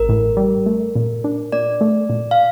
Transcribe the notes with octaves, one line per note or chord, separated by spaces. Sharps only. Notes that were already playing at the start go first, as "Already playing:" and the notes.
Already playing: A1 A#4
A2
G3
A3
A#2
D4
A#2 D5
A3
A#2
F5